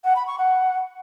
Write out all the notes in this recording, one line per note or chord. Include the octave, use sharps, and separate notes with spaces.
F#5
B5
C#6
F#5